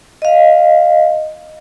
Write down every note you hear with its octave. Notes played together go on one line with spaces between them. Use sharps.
D#5 F5